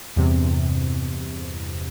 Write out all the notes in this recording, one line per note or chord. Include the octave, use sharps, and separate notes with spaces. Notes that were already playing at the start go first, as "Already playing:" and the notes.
E2 G2 C3